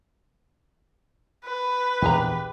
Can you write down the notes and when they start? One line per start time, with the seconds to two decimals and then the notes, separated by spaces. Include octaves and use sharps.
1.45 B4
2.02 A#1 E2 E3 G4 G#4 A#5